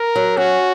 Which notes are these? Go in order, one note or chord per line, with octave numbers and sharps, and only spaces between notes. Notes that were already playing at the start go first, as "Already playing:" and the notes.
Already playing: A#4
F#3
C#4 F#4